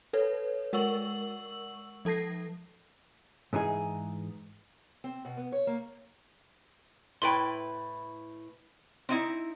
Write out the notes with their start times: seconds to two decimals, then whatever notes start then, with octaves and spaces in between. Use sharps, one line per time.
0.13 A4 B4 C#5
0.73 G#3 A#4 F#5 C#6 E6 F#7
2.05 F3 A4 A5 A#6 C7
3.53 G#2 E3 D#4 G#4
5.04 C4
5.25 B2
5.37 B3
5.52 C#5
5.67 A#3
7.22 A2 E4 B4 G5 C6
9.09 C4 D#4 E4